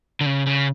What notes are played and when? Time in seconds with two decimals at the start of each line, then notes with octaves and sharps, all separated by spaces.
0.21 D3
0.26 C#3
0.46 C#3